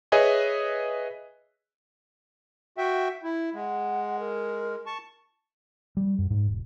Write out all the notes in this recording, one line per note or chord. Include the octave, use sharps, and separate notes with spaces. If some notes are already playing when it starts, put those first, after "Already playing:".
G#4 B4 C#5 D#5 E5 G#5
F#4 E5 G5
E4
G#3 F#5
A#4
A5 C#6
G3
F#2
G#2
E1